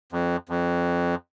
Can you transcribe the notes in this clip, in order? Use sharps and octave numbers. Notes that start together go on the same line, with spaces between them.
F2
F2